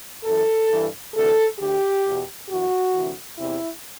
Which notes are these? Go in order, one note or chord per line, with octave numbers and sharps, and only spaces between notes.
F#2 E3 A4
G2 E3
D2 C3 E3 A4
D2 D3 G4
E2 B2
F#2 E3 F#4
D2 C3 E3
E2 C3 E3 E4